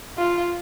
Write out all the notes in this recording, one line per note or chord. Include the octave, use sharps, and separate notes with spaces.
F4